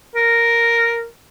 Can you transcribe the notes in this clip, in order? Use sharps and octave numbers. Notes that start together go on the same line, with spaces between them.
A#4